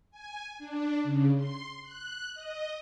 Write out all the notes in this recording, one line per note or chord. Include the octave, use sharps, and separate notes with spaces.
G#5
D4
C#3
C6
F#6
D#5